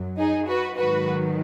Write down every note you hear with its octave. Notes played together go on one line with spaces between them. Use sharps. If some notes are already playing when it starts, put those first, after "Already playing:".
Already playing: F#2 F#3
D#4 G#4
F#4 B4
G#2 D#3 F#3 F#4 B4